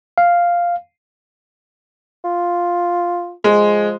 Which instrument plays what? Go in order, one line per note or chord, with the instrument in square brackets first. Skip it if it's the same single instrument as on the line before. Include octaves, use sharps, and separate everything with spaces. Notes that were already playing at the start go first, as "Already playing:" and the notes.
[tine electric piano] F5
[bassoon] F4
[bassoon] F3 [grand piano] G#3